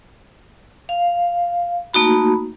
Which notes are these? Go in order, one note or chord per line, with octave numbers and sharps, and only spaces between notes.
F5
A3 A#3 D#4 F#4 B5